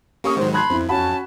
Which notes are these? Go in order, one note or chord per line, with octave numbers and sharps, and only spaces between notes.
A#3 C#4 G4 C#6 D#6
G#2 D#3 F#3 C5
A5 B5 C6 F#6 G#6
F2 C4 E4
C#4 F#4 F#5 A5 B5